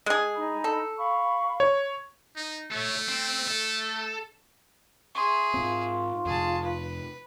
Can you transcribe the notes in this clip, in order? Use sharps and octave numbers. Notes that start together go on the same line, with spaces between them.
G#3 G#4
D#4 G#5 B5
A4
F5 B5 C#6
C#5
D#4
A3 A4 C#5
C4
A4
G#4 E5 C6 C#6
G#2 C4 F4
F2 C3 G#4 A5
B4